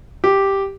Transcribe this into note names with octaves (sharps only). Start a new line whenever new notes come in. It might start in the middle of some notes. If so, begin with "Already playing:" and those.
G4